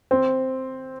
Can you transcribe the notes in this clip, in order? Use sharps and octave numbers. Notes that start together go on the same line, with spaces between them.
C4